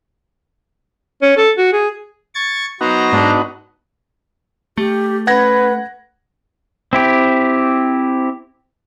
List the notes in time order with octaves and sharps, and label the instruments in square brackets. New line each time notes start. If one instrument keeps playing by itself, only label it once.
[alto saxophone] C#4
A4
F#4
G#4
[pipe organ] C#6 G#6 A6
[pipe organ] F#3 C5 A#5 [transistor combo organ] B3 D#4 F#4
[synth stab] G#2 [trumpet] D4
[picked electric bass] A3 [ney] G4
[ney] C#4 [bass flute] B4 [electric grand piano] F#5 G#6 A#6
[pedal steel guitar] C4 E4 G4